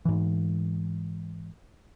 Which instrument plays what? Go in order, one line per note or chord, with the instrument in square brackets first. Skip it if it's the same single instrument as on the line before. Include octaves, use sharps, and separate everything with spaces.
[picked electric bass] G#2 E3